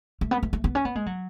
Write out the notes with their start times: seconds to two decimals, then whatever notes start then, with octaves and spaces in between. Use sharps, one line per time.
0.21 A3
0.31 B3
0.43 A3
0.53 A3
0.64 B3
0.75 C#4
0.85 B3
0.95 G#3
1.06 F#3